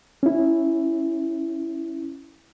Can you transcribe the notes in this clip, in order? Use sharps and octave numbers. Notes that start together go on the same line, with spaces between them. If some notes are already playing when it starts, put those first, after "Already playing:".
C#4 E4